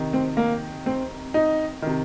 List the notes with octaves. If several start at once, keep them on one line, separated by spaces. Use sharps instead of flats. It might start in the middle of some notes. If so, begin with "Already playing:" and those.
Already playing: C3 D#3
C4
A#3
C4
D#4
C3 D#3